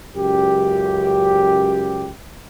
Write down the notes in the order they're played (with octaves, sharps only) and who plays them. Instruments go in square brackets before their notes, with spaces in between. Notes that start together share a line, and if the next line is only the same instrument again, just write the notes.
[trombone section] C#2 F#2 G4